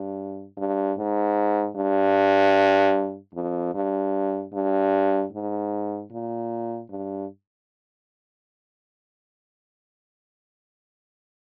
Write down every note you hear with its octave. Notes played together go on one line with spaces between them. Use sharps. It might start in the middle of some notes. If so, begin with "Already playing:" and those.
Already playing: G2
G2
G#2
G2
F2
G2
G2
G#2
A#2
G2